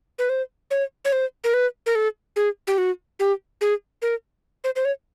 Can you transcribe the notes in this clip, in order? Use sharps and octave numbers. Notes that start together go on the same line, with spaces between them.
B4
C5
C#5
C#5
C5
A#4
B4
A#4
A4
G#4
G4
F#4
G4
G#4
A#4
C5
C5
C#5